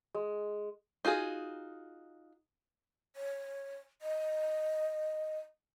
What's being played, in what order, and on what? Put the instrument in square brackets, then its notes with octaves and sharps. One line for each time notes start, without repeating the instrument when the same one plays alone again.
[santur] G#3
[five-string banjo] D#4 F4 F#4 G#4
[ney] C#5
D#5